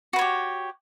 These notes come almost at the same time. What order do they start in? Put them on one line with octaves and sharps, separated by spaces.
F#4 B4 C#5 G4